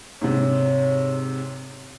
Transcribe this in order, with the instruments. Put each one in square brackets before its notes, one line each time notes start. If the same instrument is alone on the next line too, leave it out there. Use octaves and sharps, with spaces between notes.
[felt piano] G#2 C3 [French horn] C#5